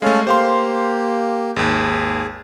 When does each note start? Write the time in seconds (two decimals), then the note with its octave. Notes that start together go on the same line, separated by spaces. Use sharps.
0.02 G#3 A3 C#4 A4 F5
0.27 A#3 G4 C5 F5 C6
1.56 G#1 D#2 G#4